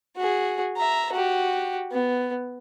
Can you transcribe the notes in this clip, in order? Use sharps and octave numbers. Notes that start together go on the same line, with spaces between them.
F#4 G#4
E5 A#5
F#4 G4
B3